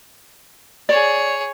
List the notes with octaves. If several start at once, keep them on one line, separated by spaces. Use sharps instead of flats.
G#4 C#5 D5